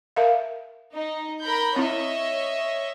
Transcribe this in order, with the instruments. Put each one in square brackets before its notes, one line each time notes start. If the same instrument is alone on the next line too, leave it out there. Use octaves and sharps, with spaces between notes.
[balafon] A#4 E5 F5
[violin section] D#4
A#4 B5 G6
[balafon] C4 E4 [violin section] C#5 D#5 E5